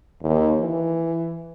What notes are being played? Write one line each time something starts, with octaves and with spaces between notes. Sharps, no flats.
D#2
E3